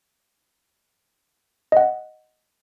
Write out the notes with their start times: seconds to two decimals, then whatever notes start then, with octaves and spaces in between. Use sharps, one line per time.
1.72 D#5 F#5